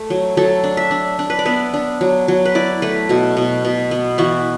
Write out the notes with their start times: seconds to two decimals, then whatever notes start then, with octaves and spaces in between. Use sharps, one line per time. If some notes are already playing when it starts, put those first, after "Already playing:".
Already playing: A3
0.10 F#3
0.37 F#3 A4
0.64 D4
0.77 E5
0.91 D4
1.19 D4
1.30 B4
1.39 D5
1.45 B3 E5
1.74 D4
2.01 F#3
2.28 F#3
2.45 B4
2.55 E4 D5
2.82 A3 B4
3.09 B2 F#4
3.37 B2
3.65 B2
3.91 B3
4.18 E3 F#4